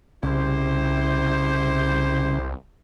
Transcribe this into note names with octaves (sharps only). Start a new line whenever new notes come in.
C2 C#3 E4 G4 C5